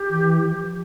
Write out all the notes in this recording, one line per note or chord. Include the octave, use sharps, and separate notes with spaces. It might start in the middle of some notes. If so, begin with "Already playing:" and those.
Already playing: G4
E3
F3